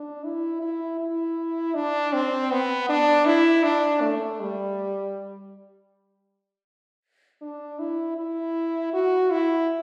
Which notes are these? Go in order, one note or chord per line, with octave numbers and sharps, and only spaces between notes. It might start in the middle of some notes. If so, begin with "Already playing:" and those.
Already playing: D4
E4
E4
E4
D4
C4
B3
D4
E4
D4
A3
G3
D4
E4
E4
F#4
E4